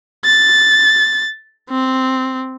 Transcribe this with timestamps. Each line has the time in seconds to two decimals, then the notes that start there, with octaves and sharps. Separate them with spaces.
0.25 A6
1.70 C4